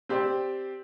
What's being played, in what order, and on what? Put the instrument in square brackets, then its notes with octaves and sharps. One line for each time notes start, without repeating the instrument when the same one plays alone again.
[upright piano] C4 G4 C5 D5